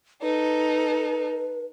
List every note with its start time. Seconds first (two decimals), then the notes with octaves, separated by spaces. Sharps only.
0.23 D#4 A4 B4